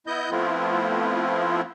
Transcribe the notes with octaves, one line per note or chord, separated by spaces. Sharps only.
B3 E4 D#5 G6
F3 A3 B3 C4 E4 F4